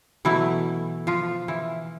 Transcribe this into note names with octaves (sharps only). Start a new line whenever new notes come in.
B2 E3 F#3 A3 E4
F3 F4
E3 E4